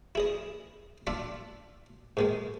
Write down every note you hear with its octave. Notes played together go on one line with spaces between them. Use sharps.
E4 G#4 D#5
D4 F4 E5 F#5
G#2 D#3 G#3